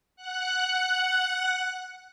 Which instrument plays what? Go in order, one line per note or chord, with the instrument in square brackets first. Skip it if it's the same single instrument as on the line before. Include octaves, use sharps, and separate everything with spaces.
[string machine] F#5 F#6